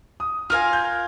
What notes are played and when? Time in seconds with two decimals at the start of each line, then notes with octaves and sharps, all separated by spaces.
0.20 D#6
0.50 F4 A#4 F5 G#5 F6
0.73 G6